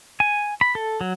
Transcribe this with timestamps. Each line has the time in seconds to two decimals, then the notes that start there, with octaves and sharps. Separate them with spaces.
0.20 G#5
0.61 B5
0.75 A4
1.01 F#3